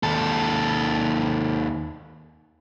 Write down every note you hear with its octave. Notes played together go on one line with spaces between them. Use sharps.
D#2 A4